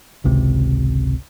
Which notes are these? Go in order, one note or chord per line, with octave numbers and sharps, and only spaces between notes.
G#1 C#2 C3